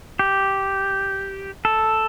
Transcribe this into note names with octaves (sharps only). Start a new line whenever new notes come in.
G4
A4